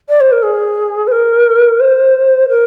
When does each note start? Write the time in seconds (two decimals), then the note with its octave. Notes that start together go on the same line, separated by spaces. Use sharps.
0.09 D5
0.21 C5
0.32 A#4
0.43 G#4
1.07 C5
1.12 A#4
1.80 C5
2.49 A#4